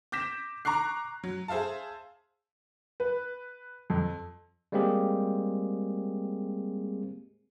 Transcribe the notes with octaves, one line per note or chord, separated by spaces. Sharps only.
D6 G6 A#6 B6 E7
A#5 C#6 D6 F#6 C7
F#3
G#4 C5 E5 F5 A5
B4
F2
G3 G#3 A#3 C4 G4 G#4